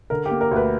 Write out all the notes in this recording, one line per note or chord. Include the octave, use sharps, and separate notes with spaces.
D3 A#4
G4
A#3
A#4
D2 B4